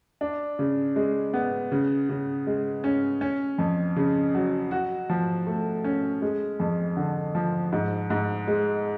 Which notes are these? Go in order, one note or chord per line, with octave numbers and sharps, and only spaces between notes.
D4
C#3
G#3
B3
C#3
C#3
G#3
C#4
C#4
F2
C#3
F#3
F#4
F3
A3
C#4
G#3
F2
D3
F3
G#2
G#2
G#3